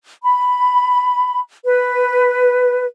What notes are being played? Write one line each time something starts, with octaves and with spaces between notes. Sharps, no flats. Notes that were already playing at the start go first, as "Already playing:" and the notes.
B5
B4